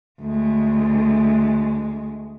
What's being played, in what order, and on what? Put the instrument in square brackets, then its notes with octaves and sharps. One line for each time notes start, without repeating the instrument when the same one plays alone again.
[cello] D2 G#3